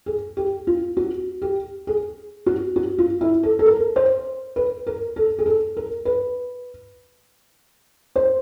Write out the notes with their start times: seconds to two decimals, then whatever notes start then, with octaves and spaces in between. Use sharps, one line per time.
0.06 G#4
0.37 G4
0.67 F4
0.97 F#4
1.42 G4
1.87 G#4
2.46 F#4
2.76 F#4
2.98 F4
3.21 E4
3.43 A4
3.59 A4
3.66 A#4
3.96 C5
4.56 B4
4.87 A#4
5.16 A4
5.39 G#4
5.46 A4
5.77 A#4
6.05 B4
8.16 C5